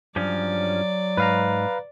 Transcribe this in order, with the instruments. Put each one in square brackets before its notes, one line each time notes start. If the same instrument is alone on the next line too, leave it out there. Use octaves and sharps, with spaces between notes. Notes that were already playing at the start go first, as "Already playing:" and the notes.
[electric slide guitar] G2 F3 C#4 [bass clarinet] F#3 [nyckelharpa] D5
[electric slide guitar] G#2 [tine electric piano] B4 F5 A#5